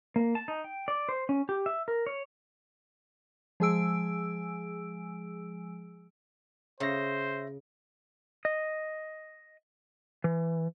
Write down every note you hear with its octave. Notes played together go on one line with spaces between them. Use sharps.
A#3
A5
D#4
G5
D5
C5
C#4
G4
E5
A#4
C#5
F3 G#3 G#4 G#5 E6 D7
C#3 C5 C#5 E5 A#6
D#5
E3